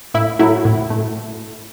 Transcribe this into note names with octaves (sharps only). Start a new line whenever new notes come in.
A2 E4
F#3 A3 E4
A2
A3